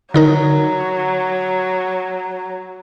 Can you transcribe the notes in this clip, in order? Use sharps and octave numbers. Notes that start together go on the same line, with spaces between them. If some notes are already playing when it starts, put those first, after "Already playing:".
D3 F#3 D#4 A#4